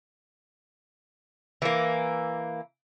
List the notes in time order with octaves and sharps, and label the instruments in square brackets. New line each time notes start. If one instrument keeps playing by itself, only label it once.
[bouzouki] E3 A#3